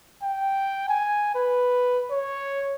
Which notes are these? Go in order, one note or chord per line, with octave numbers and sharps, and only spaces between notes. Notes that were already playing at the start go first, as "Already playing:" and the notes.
G5
G#5
B4
C#5